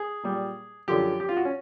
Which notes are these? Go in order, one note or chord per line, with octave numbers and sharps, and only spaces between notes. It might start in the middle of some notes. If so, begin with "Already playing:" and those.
Already playing: G#4
A#2 G3
F#2 D3 F3 G4
G4
F4
F#4
C#4